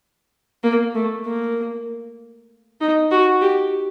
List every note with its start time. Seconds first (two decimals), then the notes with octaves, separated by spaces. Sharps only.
0.63 A#3
0.94 A3
1.25 A#3
2.81 D#4
3.11 F#4
3.41 G4